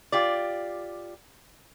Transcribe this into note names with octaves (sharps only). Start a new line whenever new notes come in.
F4 G4 D5